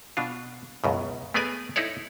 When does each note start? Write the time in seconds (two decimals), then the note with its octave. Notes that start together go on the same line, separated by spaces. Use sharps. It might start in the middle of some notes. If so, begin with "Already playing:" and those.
0.17 B2 D4 F4
0.84 C#2 F#2 B2
1.34 A3 B3 G#4 A#4 D5 G#5
1.76 D#4 E4 A4 C#5 D5